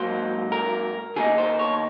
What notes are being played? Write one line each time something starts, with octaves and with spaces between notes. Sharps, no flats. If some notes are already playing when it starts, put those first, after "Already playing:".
Already playing: G#2 F#3 A#3 C5
A#4
D#3 A#3 D#4 G#4
C5
C#5